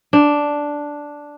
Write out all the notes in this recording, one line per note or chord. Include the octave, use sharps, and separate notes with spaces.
D4